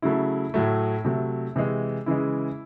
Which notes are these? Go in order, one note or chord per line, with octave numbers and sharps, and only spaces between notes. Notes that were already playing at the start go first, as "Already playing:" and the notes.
C#3 F#3 A3 E4
A2 F#3 A3
C3 F#3 A3
C3 E3 G#3
C#3 E3 G#3 E4